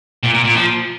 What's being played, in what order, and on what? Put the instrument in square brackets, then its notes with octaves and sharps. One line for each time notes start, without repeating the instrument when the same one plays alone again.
[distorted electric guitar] A#2
A#2
A#2
F3